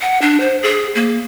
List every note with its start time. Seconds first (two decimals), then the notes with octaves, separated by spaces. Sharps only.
0.02 F#5
0.22 D4
0.40 C5
0.62 G#4
0.95 A#3